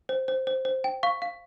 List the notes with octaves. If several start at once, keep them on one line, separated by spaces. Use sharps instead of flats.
C5
C5
C5
C5
G5
F5 C#6
F5